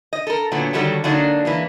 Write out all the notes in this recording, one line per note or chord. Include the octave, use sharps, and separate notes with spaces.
D#5
A4 A#4
A#2 D3 F#3 B3
D3 D#3 F#3 G3 F#4 A4
D3 F#3 A#3 D4 D#4 F#4
E3 G#3 A#3